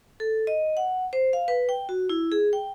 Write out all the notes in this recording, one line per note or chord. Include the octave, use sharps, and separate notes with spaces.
A4
D#5
F#5
C5
F5
B4
G5
F#4
E4
G#4
G5